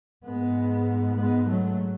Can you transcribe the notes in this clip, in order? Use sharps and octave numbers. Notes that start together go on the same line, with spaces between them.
G#2 G#3 B3
G#3 B3
F#3 A3